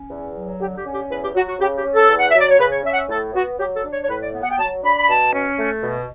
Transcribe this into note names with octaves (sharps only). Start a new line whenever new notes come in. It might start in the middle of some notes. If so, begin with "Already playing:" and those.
Already playing: C#4
E2
F#3
D3 G4
G4
C#4
G4
E2 B4
G4
F#3 F#4
F#4
C#3 G4
G4
C#4
A4
E2
F#5
E5
F#3 D5
C#5
C#3 B4
C#5
C#4 E5
F#5
E5
A2 A4
B3 F#4
F#3 G4
A4
D4
C#5
C#5
A2 B4
D5
B3
F#5
G5
F#3 A5
D4 B5
B5
B2 A5
C#4
A3
B2